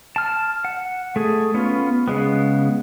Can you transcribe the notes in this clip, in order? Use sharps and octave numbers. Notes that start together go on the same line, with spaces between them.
A5 F6
F#5
A3 G#4
B3 C#4 F4
C#3 G#3 B3